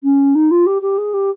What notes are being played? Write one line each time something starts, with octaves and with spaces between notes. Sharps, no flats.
C#4
D#4
F4
G4
G4
G#4
G4